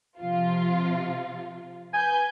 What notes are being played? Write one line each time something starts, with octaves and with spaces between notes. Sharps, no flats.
C3 F3 F4
B4 G#5 G6